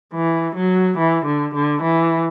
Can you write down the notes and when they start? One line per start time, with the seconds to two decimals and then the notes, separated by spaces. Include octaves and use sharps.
0.14 E3
0.56 F#3
0.98 E3
1.26 D3
1.55 D3
1.83 E3